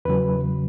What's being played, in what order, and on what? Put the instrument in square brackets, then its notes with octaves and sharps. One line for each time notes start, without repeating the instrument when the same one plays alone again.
[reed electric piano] E2 C#3 F#3 B4